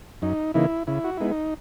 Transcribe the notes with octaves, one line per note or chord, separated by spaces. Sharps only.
F#2 D#4
C#3 E3 A#3 D#4 E4
C#3 E4
F#4
G#3 B3 D#4 E4
D#4